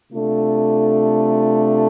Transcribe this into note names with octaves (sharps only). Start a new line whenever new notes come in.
C3 A3 D4 F4 A4